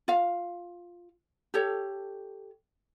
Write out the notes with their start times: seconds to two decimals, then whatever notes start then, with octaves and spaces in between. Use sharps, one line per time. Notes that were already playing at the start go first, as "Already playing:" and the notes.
0.08 F4 F5
1.54 G4 A4 C#5